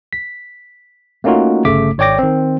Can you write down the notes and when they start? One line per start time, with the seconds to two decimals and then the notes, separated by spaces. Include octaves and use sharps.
0.13 B6
1.24 A3 A#3 C#4 D#4 F4 F#4
1.65 G1 C#3 A3 D6 B6
1.98 G#1 C#5 D5 G5 D6 A#6
2.19 D#3 C4